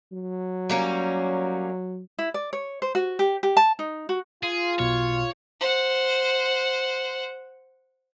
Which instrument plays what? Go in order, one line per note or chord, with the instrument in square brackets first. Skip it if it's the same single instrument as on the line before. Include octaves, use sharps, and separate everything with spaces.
[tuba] F#3
[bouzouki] G3 A#3 C#4
[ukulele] E4
D5
C#5
C5
F#4
G4
G4
A5
D#4
F#4
[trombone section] F4 [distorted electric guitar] G#4
[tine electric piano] B1 B2 F6 [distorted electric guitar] C#5
[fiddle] C5 F#5